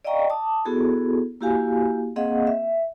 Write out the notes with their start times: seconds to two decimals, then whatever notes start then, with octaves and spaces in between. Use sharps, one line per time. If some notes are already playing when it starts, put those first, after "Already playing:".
0.04 D5 D#5 F5 G5 A#5 C#6
0.30 A5 D6 D#6
0.65 B3 E4 F#4 G#4 A4
1.41 A#3 E4 F#4 G4 F5 G#5
2.16 A#3 C4 G#4 D#5 F5 F#5
2.47 E5